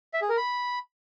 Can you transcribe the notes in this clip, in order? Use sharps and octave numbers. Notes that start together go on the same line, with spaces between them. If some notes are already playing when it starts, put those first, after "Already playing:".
E5
G#4
A#4
B5